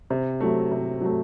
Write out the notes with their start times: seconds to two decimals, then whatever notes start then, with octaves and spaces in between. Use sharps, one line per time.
0.10 C3
0.40 F#3 A3
0.71 C3
1.01 F#3 A3